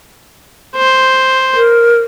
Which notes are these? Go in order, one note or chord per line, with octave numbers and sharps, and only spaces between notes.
C5
A#4